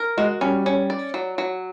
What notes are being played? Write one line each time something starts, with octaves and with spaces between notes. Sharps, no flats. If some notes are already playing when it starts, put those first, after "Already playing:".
Already playing: A#4
G#3 F#4
G3 C#4
C#4
D5
F#3
F#3